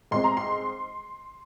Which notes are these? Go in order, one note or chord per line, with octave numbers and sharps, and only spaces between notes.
G#2 G#3 C4 C6
A#5
C6